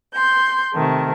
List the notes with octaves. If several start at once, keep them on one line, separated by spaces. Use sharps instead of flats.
C6 G6
C3 D#3 A3